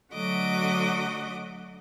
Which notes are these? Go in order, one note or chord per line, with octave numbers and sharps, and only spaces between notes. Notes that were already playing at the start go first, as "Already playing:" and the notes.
D3 F#3 A3 F#4 D#5 D6